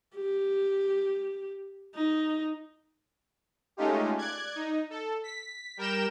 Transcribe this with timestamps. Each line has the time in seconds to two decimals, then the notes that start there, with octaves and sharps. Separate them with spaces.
0.16 G4
1.95 D#4
3.77 G#3 A3 C#4 D#4 F4 G4
4.18 D5 F#6 G#6
4.55 D#4
4.90 A4
5.24 B6
5.77 G3 A#4 G5 E7